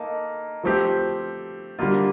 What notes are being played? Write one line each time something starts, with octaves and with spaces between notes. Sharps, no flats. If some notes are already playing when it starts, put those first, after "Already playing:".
Already playing: A#3 D#4 A4
F3 A3 C4 G4
D3 G3 A#3 F4